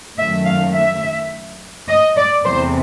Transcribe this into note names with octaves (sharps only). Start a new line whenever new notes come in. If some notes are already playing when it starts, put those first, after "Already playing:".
F#2 D#3 F#3 A3 E5
F5
E5
D#5
D5
E2 C3 E3 A3 C5